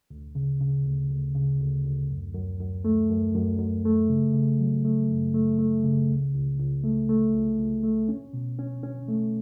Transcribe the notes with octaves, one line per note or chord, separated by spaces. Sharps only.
D2
C#3
C#3
D2
D2
C#3
D2
D2
F#2
F#2
F#2
A3
F#2
F#2
F#2
A3
C#3
C#3
F#3
A3
F#2
A3
A3
C#3
C#2
C#2
C#2
A3
A3
C#2
C#2
A3
C#4
B2
C#4
C#4
A3